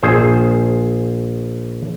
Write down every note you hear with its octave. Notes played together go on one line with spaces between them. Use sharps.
A#1 G#4 C5